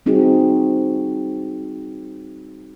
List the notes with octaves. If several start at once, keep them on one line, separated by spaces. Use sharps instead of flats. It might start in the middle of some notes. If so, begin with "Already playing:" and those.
G3 C4 D#4 F#4 G#4